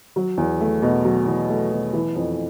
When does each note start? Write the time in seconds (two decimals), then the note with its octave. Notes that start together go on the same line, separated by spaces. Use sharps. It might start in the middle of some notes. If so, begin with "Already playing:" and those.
0.16 F#3
0.37 E2
0.61 A3
0.82 B2
1.05 F#3
1.27 E2
1.50 A3
1.72 B2
1.93 E3
2.16 F2